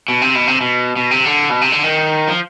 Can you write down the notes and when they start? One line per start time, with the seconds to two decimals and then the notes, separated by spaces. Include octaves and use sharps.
0.08 B2
0.21 C3
0.35 B2
0.47 C3
0.61 B2
0.96 B2
1.11 C3
1.25 D3
1.50 B2
1.61 C3
1.72 D3
1.84 D#3
2.28 F3